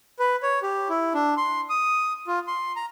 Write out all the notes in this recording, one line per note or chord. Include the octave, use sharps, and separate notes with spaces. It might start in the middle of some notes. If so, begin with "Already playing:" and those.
B4
C#5
G4
E4
D4
C6
D#6
F4
C6
A#5